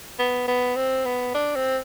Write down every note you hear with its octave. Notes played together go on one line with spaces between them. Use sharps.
B3
B3
C4
B3
D4
C4